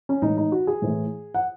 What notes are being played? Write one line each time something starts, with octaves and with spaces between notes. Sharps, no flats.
C#4
A2 E3 G#3 D#4
D#4
F#4
G#4
A2 E3 A3
F#5